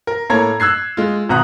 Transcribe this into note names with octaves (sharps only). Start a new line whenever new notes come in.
A#4
A2 A#3 A4 C#5 A#5 G#6
E6 F#6 G#6 C7
G#3 F4
G#1 B2 F#5 A#5 D#6 F#6